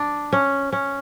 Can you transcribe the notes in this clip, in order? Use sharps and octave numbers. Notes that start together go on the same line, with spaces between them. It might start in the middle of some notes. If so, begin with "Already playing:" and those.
Already playing: D4
C#4
C#4